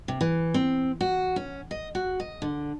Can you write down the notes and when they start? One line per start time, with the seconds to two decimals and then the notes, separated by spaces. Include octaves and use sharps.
0.08 C3
0.21 E3
0.54 C4
1.01 F#4
1.36 C#4
1.71 D#5
1.95 F#4
2.20 D#5
2.42 D3